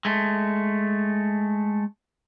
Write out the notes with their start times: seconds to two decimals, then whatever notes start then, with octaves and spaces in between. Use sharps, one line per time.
0.05 G#3 A3